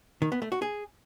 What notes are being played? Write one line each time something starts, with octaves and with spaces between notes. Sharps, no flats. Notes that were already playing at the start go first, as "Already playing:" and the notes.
D#3
B3
A3
F#4
G#4